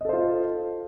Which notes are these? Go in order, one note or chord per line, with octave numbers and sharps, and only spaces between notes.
F4 A4 C5 D#5